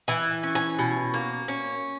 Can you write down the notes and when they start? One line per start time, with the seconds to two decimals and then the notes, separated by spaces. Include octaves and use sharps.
0.08 E3 G#5
0.43 C#4
0.55 G#5
0.79 B2
1.14 A#3
1.48 C#4